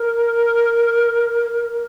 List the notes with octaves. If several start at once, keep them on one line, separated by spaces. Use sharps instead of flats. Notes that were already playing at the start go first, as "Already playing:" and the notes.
Already playing: A#4